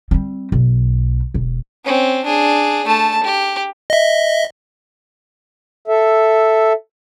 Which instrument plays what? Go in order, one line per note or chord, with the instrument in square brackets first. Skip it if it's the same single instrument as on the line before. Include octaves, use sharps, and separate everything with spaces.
[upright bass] G3 C4
B1
E1
[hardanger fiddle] C4 C#4
D4 G#4
A3 A5
G4
[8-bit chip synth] D#5 E5
[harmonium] A4 E5